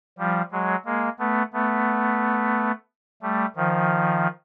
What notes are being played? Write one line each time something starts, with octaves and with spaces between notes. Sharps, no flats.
F3 G3
F#3 G#3
G#3 A#3
A3 B3
A3 B3
G3 A3
D#3 F3